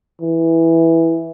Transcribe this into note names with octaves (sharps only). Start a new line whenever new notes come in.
E3